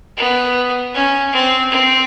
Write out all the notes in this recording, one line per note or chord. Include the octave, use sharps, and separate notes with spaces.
B3
C#4
C4
C4